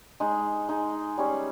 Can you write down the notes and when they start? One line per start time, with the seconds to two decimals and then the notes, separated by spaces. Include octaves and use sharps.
0.20 G#3 D#4 G#4
0.69 G#3 D#4 G#4
1.18 G3 C#4 G#4